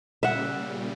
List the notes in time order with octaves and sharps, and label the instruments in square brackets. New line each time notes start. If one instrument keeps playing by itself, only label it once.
[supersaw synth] A#2 C#3 G3 [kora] E5 F#5